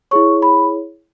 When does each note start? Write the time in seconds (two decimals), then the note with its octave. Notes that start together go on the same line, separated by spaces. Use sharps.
0.11 E4 G#4 C#5 C#6
0.42 B5